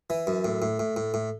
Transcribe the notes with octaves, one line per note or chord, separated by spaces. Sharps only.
E3
F#2
A2
A2
A2
A2
A2